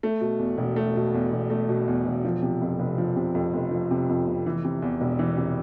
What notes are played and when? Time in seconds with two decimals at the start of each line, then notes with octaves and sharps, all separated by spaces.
0.03 A3
0.21 B2
0.39 E2
0.58 E1
0.76 A3
0.96 B2
1.14 E2
1.32 E1
1.50 A3
1.69 B2
1.88 E2
2.06 E1
2.25 F3
2.42 C3
2.62 F2
2.79 F1
2.98 F3
3.16 C3
3.35 F2
3.53 F1
3.71 F3
3.91 C3
4.09 F2
4.27 F1
4.46 E3
4.65 C3
4.82 E2
5.01 E1
5.19 E3
5.37 C3